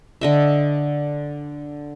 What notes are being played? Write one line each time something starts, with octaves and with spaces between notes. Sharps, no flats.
D3 D#5 E5